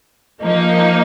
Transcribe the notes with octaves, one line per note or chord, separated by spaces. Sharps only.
F3 A#3 D#4